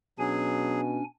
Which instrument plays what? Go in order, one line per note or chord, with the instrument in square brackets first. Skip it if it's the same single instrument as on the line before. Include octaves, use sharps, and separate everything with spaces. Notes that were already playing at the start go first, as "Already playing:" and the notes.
[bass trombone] B2 [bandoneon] F#3 G#4 [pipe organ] C#4 D4 G#5